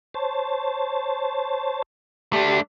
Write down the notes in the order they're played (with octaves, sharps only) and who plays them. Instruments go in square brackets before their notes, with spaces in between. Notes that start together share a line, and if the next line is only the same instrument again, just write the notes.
[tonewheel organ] C5 C#5 A5
[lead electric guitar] A3 D4 [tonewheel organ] G4 D5 C6